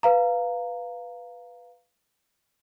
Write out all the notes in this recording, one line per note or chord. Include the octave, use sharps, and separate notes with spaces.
B4 F5 A#5